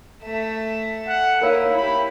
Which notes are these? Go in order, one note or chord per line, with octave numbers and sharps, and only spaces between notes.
A3 E5
F#5
A#3 D#4 E4 A#4 C#5 F5
E4 G4 B5